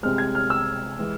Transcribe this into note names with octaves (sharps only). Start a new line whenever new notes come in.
C2 C3 G#3 F6
G#6
F6
E6
E3 G#3